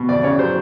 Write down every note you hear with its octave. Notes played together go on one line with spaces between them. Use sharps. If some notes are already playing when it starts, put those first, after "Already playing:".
Already playing: B2
F2 D5
C#3 C#5
F#3 C5